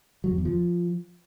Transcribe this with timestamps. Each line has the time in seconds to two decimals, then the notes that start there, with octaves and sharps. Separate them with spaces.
0.24 F#3
0.31 F2
0.38 E2
0.45 F3